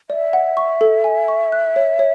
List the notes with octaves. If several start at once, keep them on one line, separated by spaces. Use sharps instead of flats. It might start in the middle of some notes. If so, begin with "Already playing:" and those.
D5 E5
F#5
C#6
A4
G#5
C#6
F#6
C#5
C#5